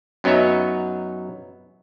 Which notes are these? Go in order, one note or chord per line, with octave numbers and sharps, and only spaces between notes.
F#2 F#3 B3 D#4 C#5 E5